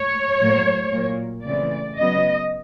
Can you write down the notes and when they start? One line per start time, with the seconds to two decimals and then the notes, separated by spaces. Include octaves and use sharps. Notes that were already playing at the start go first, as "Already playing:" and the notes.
Already playing: C#5
0.41 A2 F#3 A#3
0.93 A#2 F#3 A#3
1.45 C#3 E3 A3 C4 D5
1.97 C#3 F#3 B3 D#5